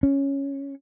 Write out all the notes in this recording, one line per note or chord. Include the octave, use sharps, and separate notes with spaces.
C#4